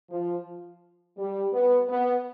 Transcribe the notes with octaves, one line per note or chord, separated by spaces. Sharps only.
F3
G3
B3
B3